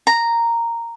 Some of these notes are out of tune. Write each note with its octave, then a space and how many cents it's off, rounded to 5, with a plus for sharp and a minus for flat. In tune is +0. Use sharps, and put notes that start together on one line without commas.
A#5 -5